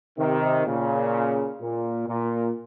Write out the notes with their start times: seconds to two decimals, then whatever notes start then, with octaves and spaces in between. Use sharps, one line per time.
0.18 C3 D#3
0.66 A#2 C#3
1.61 A#2
2.08 A#2